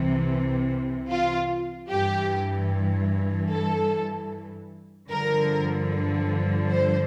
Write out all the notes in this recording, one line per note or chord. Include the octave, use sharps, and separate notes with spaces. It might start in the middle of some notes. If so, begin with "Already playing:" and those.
Already playing: C2 C3 E3
F4
G2 E3 G4
A4
G2 D3 F3 A#4
C5